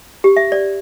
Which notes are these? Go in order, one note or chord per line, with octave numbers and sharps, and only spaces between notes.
G4
E5
D5